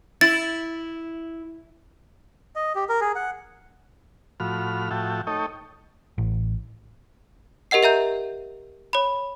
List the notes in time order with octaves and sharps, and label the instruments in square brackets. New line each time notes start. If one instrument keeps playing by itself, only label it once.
[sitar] E4 [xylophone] A6
[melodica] D#5
G4
A#4
G#4
F#5
[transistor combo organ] A2 F3 F#4 B5 F6
A2 F3 F#4 E5 G5 A5
A3 D#4 A4 C#5 D#5 G5
[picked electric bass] A1
[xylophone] G4 A#4 D#5 F#5 C7
A#4 E5 A#5 G6
C#5 B5